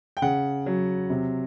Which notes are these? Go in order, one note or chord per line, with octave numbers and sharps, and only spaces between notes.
G5
C#3 F#5
F#3
C3